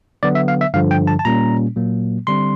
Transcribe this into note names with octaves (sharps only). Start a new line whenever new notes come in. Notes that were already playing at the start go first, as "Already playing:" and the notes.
D3 F#3 B3 D5
E5
F5
E5
G2 D3 F3 F5
G5
A5
A5
A#2 G3 A#3 C#4 A#5
A#2 F#3 A#3
D3 G3 C4 C6